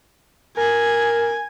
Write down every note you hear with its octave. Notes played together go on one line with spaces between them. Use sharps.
A#4 G#5